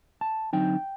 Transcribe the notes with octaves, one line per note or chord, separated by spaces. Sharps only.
A5
D3 F#3 C4 D#4 G5